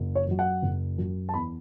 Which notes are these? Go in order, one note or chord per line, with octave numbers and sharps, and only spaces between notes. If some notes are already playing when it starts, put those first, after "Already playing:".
Already playing: F#1
C#5
F#2 F#3
F#5
F#1
F#2 F#3
A5
E2 B5